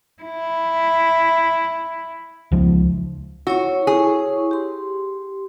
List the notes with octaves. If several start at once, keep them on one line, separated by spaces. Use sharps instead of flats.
E4
C#2 F3
E4 F#4 C#5 C#6
G#4
G4 C6